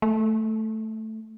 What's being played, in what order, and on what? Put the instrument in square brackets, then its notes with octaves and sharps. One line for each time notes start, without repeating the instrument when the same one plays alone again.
[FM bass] A3